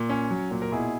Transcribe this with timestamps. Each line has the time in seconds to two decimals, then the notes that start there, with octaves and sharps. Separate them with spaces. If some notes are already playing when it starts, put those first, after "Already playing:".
Already playing: A#2
0.09 C#4
0.30 F#3
0.51 A#2
0.62 A#4
0.72 B2 E4 G#4